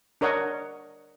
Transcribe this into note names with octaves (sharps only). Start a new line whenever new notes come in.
D4 A#4 C#5 D#5 F#5